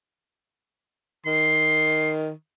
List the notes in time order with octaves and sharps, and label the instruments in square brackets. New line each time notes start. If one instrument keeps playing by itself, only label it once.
[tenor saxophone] D#3 [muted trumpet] C6